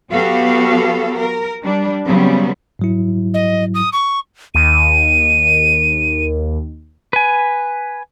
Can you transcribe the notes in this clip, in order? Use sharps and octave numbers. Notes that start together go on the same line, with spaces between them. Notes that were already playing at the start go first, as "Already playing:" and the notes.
F#3 B3 F#4 G4 A4 F5
A#4
G3 D4
C#3 F#3 G3 B3 C4
G#2 F#3 E4
D#5
D#6
C#6
D#2 D#7
B4 G#5